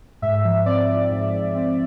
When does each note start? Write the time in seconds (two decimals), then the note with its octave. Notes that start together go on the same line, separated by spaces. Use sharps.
0.22 G#2 E5
0.45 F3
0.66 C4 D5
0.88 F3
1.11 G#2
1.32 G#2
1.55 C4